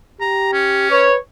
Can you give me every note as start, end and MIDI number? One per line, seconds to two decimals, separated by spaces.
0.21 0.89 67
0.21 0.50 82
0.53 1.03 61
0.91 1.17 71
0.91 1.15 73